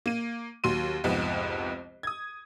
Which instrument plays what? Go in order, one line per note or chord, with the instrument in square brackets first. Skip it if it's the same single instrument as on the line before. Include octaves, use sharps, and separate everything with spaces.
[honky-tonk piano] A#3 D#7
D#2 F#3 C6 D#7
C2 F2 G#2 B3
D#6 G#6